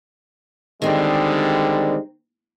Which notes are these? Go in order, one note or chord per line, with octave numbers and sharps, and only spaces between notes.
D3 D#3 G3 G#3 C4